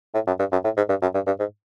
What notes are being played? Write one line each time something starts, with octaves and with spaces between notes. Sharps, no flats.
A2
F#2
G2
F#2
A2
G#2
G2
F#2
G2
G2
G#2